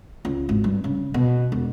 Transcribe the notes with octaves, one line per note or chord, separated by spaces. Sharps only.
C#2
G#1
G2
C#3
B2
E1